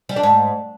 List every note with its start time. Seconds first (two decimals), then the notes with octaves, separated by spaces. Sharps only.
0.09 G3
0.16 D4
0.23 G#2